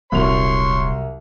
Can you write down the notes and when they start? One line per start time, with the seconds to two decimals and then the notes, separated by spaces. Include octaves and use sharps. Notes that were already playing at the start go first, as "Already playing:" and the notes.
0.12 D#1 C2 F#3 C#5 C6 F7